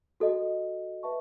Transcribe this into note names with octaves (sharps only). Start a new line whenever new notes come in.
F#4 A4 D#5
B4 E5 A5 C#6